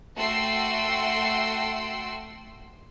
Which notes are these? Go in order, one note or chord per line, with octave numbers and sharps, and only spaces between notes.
A3 F#4 G5 C6 E6 C7